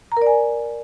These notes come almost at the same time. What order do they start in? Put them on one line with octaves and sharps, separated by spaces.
A#5 A#4 D5 G#5